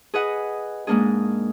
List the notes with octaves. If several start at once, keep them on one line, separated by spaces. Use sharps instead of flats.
G#4 B4 D#5 F#5
G#2 G#3 A#3 D4 G#4